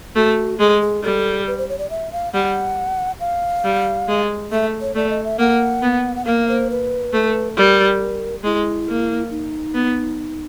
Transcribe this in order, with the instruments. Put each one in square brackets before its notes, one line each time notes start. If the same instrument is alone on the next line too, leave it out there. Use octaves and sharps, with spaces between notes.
[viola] A3 [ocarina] F#4
[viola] G#3 [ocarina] G#4
[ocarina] G#4
[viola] G3 [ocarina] A4
[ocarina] B4
C5
C#5
D5
E5
F5
[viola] G3 [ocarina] F#5
[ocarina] F5
[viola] G3
G#3
[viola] A3 [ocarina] E5
[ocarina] C#5
[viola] A3 [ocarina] D5
[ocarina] D#5
E5
[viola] A#3 [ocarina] F#5
[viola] B3
[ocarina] F#5
[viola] A#3 [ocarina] F5
[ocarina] C5
B4
[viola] A3
[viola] G3 [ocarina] A#4
[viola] G#3 [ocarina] E4
[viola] A#3
[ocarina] D#4
[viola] B3